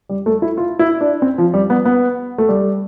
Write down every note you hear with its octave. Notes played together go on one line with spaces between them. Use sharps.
G3
A3
E4
F4
E4
D4
C4
F3
G3
B3
B3
A3
G3